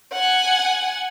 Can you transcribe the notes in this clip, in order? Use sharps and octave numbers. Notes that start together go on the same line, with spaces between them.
F#5 G#5